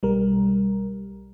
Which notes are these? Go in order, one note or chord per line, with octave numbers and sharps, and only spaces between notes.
B1 G3 A#4